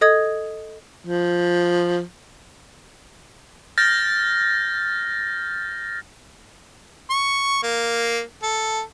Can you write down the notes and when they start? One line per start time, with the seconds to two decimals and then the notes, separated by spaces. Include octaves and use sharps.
0.01 A4 D#5 D#6 G#6
1.05 F3
3.78 F6 G6 A6 A#6
7.10 C#6
7.63 A#3
8.43 A4